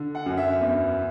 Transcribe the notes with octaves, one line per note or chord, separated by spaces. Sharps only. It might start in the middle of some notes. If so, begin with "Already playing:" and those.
Already playing: D3
F#5
F#2
E5
E2